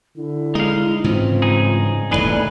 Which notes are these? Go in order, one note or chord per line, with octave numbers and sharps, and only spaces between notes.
D3 E4
G#3 D#4 F5
G#2 C#3 E3 C4 F4
G2 D#4 G#4
D#1 C2 A2 D#3 G#3 G#4 B4 D5